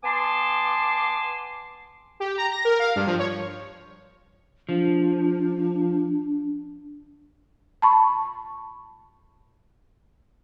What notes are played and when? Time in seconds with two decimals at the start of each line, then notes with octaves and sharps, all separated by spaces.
0.04 B3 G#5 A5 C6 D6
2.20 G4
2.38 A#5
2.52 A#6
2.65 A#4
2.79 F5
2.96 G2
3.07 F3
3.19 C#5
4.69 F3 D4
7.82 A5 B5 C#6